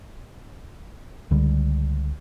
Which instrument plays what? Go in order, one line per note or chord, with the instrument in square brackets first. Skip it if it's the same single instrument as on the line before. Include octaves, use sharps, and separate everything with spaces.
[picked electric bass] C#2 D3 G3